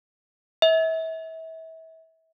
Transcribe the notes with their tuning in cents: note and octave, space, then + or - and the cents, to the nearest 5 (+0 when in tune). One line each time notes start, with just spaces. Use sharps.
E5 -30